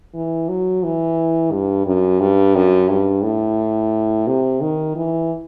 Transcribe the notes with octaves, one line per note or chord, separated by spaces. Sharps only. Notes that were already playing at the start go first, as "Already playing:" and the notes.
E3
F#3
E3
G2
F#2
G2
F#2
G2
A2
C3
D#3
E3